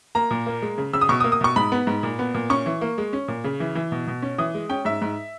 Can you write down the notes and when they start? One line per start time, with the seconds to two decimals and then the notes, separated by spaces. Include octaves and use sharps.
0.15 A#3 A#5
0.31 A#2
0.47 A#3
0.62 G#3
0.78 C#3
0.93 C#3 E6
1.01 D#6
1.09 B2 C#6
1.20 D#6
1.24 A#3
1.32 D#6
1.41 B2 C#6
1.56 G#2 B5
1.72 B3
1.87 G#2
2.03 A#2
2.19 B3
2.34 A#2
2.50 C#4 C#6
2.66 E3
2.81 A#3
2.98 G#3
3.13 C#4
3.28 A#2
3.44 C#3
3.60 E3
3.75 E3
3.92 B2
4.07 B2
4.22 C#4
4.38 E3 D#6
4.54 G#3
4.70 C#4 G5
4.85 G#2 E5
5.01 G#2